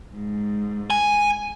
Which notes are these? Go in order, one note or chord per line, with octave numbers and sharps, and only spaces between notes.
G#2
G#5